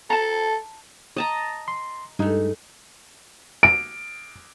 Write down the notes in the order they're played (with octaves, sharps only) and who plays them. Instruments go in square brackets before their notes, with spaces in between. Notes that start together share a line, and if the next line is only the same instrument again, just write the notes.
[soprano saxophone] A4 [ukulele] A5 A#5
[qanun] D#5 A5 A#5
[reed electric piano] C6
[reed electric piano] G2 D#4 [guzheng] G#3 A3
[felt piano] D7